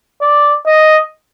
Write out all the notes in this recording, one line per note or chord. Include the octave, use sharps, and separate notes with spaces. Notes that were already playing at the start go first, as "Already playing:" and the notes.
D5
D#5